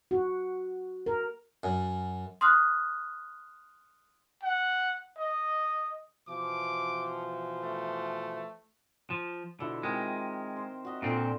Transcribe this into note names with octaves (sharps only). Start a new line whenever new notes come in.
F#4
A#4
F#2
C6 D#6 F6 F#6
F#5
D#5
B2 E3 F3 D6
A3
F3
B2 D3 F3 E4
D#3 G#3 C4 A#4
C5
F#4 D#5 E5
A#2 D3 C4 F4